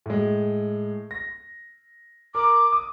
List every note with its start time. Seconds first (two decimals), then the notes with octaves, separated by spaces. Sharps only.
0.06 A2 G#3
1.11 A#6
2.35 A#4 D6
2.72 D#6